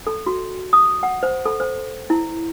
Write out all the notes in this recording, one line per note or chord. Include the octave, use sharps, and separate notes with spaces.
A4
F#4
D#6
F#5
C5
A4
C5
E4